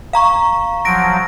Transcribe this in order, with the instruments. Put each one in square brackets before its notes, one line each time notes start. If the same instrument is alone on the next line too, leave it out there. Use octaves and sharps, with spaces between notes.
[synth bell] F5 A#5 C#6
[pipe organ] F3 F#3 [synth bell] A#6 D7